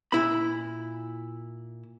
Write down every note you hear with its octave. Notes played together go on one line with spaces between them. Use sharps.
A#2 E4 B5